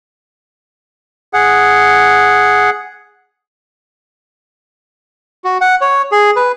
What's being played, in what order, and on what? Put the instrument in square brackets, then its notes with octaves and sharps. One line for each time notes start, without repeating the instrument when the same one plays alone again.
[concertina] G#4 F#5
F#4
F#5
C#5
G#4
B4